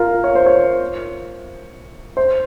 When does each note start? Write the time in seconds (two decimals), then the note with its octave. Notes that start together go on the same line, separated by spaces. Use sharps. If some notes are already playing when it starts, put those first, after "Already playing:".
Already playing: F4 A#4
0.24 C#5
0.35 C5
0.46 C#5
2.17 C5